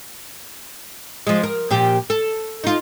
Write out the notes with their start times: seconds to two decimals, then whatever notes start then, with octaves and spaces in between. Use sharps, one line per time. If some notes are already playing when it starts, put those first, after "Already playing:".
1.27 F3 G#3
1.43 A#4
1.71 A#2 F3 G4
2.10 A4
2.64 D#4 F4